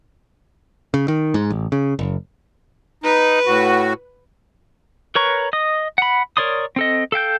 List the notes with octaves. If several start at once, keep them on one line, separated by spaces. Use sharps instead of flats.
C#3
D#3
G#2
A1
C#3
F#1
D#4 B4
A2 F#4
A#4 B4 C#5 A#5 C#6
D#5 D#6
F#5 B5
A#4 C#5 D5 C6 D#6
C4 A4 D#5
A4 F5 G5 G6